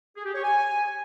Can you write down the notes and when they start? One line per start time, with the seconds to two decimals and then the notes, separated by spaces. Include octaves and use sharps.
0.16 G#4
0.25 G4
0.34 C#5
0.44 G#5